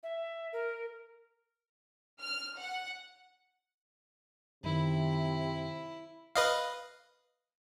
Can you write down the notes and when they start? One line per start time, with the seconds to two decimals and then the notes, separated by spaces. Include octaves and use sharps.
0.03 E5
0.53 A#4
2.20 F6
2.59 F#5
4.64 F#2 C3 D#3 E4
6.35 B4 D#5 F5